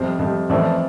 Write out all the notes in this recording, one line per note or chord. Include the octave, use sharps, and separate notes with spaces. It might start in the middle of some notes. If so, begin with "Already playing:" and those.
Already playing: F2 C3 G3 C5
F2 C3 G3
F2 E3 A3 C4 D5